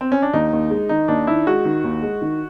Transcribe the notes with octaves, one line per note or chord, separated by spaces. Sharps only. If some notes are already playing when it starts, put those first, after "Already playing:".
C4
C#4
D4
D#2 D#4
D#2
G#3
D#3 D#4
D#2 D4
D#3 E4
G#3 F#4
D#3
D#2
G#3
D#3